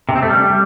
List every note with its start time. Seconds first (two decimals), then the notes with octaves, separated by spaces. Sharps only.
0.09 C3
0.16 C4
0.23 A3
0.29 G3